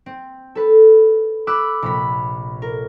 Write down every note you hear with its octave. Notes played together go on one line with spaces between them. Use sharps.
C4
A4 B4
B5 D6 E6 F#6
A#1 C3 B5
A#4